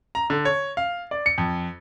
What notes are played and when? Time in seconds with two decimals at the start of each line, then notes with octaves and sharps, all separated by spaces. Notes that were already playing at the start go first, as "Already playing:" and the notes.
0.15 A#5
0.30 D3
0.45 C#5
0.77 F5
1.11 D5
1.26 C#7
1.38 F2